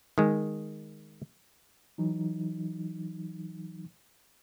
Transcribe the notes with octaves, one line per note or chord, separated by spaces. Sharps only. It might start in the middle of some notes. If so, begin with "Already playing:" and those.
D#3 G#3
E3 F#3 D#4